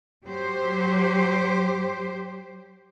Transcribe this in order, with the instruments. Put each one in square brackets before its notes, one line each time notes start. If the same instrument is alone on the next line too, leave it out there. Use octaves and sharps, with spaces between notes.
[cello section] F#3 G4 C5